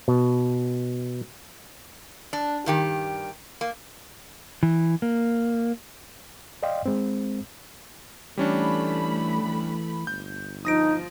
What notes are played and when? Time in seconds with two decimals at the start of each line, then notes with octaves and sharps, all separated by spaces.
0.08 B2
2.33 D4
2.66 G2 D#3 G4
3.61 A#3
4.63 E3
5.02 A#3
6.63 D5 D#5 F5 G5 C6
6.86 G#3 C4
8.38 E3 G3 A3 C#4 D4 B5
9.43 E3
10.07 G1 G6
10.65 F3 D#4 D#6 A#6 D7